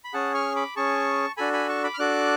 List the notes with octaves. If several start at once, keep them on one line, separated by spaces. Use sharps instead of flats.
B5
C#4 G#4 F#5 A5
C#6 F6
B5 D6
C#4 G#4 A5 C#6
D4 F#4 A4 G#5 B5
G#5 B5
A5 C#6
B5 D6
F6
D4 F#4 A4 D6 F#6